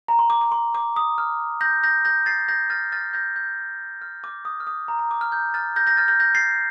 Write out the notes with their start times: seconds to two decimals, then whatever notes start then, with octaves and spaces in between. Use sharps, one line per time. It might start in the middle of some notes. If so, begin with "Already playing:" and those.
0.08 A#5
0.19 C6
0.30 D6
0.41 D6
0.52 C6
0.75 D6
0.96 D#6
1.18 F6
1.61 G6 A#6
1.83 G6 A#6
2.05 G6 A#6
2.26 A6 C7
2.49 G6 A#6
2.70 F6 A6
2.92 F6 A6
3.13 G6 A#6
3.36 G6
4.02 F6
4.24 D6
4.45 D#6
4.60 F6
4.67 D#6
4.88 A#5
4.99 A#5
5.11 D6
5.21 F6
5.32 G6
5.54 F6 A6
5.76 G6 A#6
5.87 G6 A#6
5.97 F6 A6
6.08 G6 A#6
6.20 G6 A#6
6.35 A6 C7